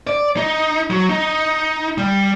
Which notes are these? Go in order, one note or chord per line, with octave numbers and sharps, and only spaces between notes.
D5
D#4
F#3
D#4
G3